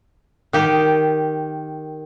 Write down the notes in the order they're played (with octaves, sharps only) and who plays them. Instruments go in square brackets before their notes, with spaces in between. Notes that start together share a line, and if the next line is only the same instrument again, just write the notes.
[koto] D#3 G4